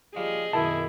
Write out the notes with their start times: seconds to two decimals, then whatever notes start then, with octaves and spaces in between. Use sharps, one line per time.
0.16 F3 G3 G#4 D#5 F5
0.53 B1 F#2 D#3 E4 A5